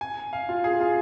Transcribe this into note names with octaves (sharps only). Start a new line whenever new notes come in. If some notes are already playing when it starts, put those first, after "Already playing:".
G#5
F5
F4
G#4
F4